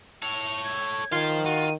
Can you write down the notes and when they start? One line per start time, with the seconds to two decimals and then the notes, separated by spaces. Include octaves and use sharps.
0.22 A4 C#5 F7
0.64 G#6
1.12 D#3 F4 C5 F5
1.45 F4 F#4 D#7